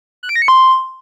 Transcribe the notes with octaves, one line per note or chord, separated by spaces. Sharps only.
F#6
D7
A#6
C#7
C6